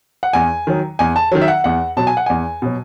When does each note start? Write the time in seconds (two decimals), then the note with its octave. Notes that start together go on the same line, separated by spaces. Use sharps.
0.23 F#5
0.33 E2 G#5
0.67 D#3 F#3
0.99 E2 G#5
1.16 A5
1.32 D#3 F#3
1.41 E5
1.48 F#5
1.64 E2 F#5
1.97 B2 F#3 A5
2.07 G#5
2.17 F#5
2.26 E2 G#5
2.62 B2 F#3